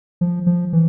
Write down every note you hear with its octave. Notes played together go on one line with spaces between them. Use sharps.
F3
F3
E3